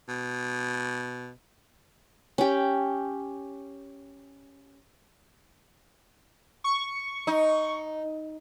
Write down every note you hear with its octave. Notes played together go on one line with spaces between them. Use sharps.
B2
C#4 G4
C#6
D#4